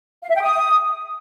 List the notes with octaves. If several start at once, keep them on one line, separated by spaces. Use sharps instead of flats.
F5
E5
G5
D#6